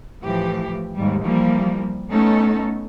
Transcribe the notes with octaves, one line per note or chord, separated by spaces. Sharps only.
A2 E3 F3 G4
D#2 G#2 G3
E3 F3 G3 A#3
A3 B3 C#4 D#4 A4